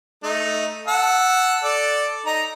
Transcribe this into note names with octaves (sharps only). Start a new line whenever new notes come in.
A3 D#4
F#5 A5 E6
A4 D5
D#4 A#5